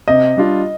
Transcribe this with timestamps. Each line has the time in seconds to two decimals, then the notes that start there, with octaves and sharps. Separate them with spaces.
0.08 C3 D#5
0.37 G3 D4 F4